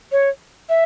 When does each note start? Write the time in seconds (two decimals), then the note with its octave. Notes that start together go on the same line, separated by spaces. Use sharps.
0.12 C#5
0.69 E5